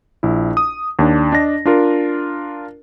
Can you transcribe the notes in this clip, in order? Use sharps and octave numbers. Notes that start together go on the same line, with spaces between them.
A#1 E4
D#6
D#2 D4
D4 D#5 A5 A#6
D4 F4 A#4